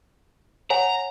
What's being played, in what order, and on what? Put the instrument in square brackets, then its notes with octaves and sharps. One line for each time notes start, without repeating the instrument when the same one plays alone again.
[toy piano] C#5 F#5 G#5 [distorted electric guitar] A#5